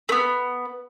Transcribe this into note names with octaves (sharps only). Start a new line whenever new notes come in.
A3 B3